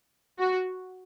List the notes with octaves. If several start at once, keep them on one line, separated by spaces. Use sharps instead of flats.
F#4